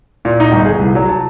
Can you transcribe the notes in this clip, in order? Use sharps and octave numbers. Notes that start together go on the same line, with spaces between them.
A#2
D#4
G1
G#4
C2
F#3
A5